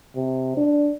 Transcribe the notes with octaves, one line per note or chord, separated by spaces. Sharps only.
C3
D4